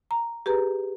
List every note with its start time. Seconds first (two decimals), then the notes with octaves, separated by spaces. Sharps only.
0.11 A#5
0.46 G4 G#4 B4 A#5